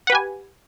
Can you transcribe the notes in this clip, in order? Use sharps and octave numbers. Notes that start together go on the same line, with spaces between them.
G4 B4 F#5 G#5